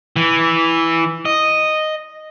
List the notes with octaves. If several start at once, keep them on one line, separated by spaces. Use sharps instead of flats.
E3
D#5